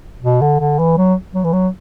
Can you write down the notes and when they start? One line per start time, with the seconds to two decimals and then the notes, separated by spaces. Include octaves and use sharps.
0.22 B2
0.42 D3
0.60 D3
0.79 E3
0.98 F#3
1.34 F#3
1.44 E3
1.53 F#3